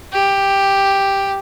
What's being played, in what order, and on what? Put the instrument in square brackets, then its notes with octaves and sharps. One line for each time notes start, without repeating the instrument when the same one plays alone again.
[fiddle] G4